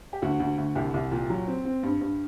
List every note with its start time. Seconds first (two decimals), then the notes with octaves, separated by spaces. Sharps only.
0.13 G4
0.22 D2 F#4
0.40 D2
0.58 D2
0.76 C2 G4
0.94 C2
1.12 A#2
1.30 F#3
1.47 C4
1.65 C4
1.83 G2
2.01 G2